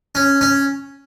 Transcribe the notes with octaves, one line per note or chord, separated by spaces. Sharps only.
C#4
C#4